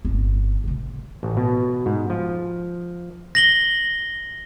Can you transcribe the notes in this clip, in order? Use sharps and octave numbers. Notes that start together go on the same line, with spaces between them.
G1 C4
A2 C3
A1
B2
G#2
F3
A#6 F#7 G7